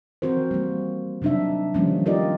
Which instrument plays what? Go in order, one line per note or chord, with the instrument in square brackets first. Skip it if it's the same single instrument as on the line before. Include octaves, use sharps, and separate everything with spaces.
[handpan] E3 F3 C4 F#4 A#4 C5
G3 A#3
C3 F#3 D4 D#4 E5
D#3 F3 G3 A#3 C#4
D#4 F4 G4 A#4 D5 D#5